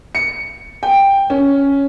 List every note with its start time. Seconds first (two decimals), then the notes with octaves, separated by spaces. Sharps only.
0.15 C#7
0.83 G5
1.30 C#4